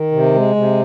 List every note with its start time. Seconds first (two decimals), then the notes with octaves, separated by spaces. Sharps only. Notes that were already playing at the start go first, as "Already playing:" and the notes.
Already playing: D#3
0.12 C3
0.34 G#3
0.56 C3